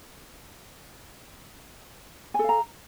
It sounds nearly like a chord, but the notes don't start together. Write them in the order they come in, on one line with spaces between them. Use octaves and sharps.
G#5 A4 F5 A#5